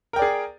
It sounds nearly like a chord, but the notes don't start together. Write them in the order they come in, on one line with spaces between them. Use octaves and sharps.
A#4 G5 D5 G#4